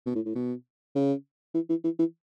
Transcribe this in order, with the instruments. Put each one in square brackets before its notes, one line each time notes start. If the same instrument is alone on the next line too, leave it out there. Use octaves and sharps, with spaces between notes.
[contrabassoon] B2
A2
A2
B2
C#3
E3
E3
E3
E3